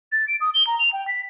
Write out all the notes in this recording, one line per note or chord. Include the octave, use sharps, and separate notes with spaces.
A6
D7
D#6
G7
A#5
F7
G5
B6